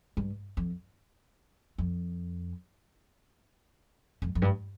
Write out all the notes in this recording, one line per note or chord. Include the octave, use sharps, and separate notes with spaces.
G2
F2
F2
F2
F2
G2